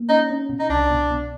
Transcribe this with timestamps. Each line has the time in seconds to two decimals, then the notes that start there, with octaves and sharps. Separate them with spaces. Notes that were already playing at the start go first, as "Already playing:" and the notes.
Already playing: A#3
0.09 C#4 D#4
0.30 C#4
0.49 B2
0.60 D#4
0.69 C2 D4
0.90 B2
1.10 B2